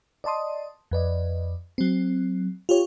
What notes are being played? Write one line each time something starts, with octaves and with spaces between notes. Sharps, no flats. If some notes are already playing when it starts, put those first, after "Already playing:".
D5 D#5 A5 C6 D#6
F2 B4 D5 D#5
F#3 C4
F4 G4 C#5